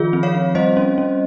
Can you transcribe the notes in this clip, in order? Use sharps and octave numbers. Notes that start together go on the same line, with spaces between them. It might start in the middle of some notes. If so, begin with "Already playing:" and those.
Already playing: D#3 F3 F4 G#4
C4
C#5 F5
C4
G3 C5 D#5
C#4
C#4